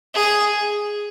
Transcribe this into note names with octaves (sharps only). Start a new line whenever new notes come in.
G#4